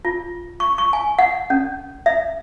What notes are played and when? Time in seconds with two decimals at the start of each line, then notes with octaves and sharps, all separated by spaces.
0.05 F4
0.60 C#6
0.78 C#6
0.93 G#5
1.19 F#5
1.50 C#4
2.06 E5